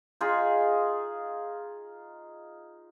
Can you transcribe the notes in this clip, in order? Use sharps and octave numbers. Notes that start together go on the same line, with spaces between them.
D#4 F4 G#4